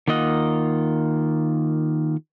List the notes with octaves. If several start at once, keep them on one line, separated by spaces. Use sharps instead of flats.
D#3 A#3 F4 D#5 F#5